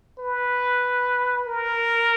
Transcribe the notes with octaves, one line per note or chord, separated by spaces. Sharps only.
B4
A#4